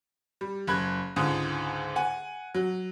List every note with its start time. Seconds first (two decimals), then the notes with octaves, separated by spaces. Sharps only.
0.41 G3
0.67 F#1 B5 F#6 G#6
1.16 C#2 G#2 D3 D#6
1.96 F#5 G#5
2.55 F#3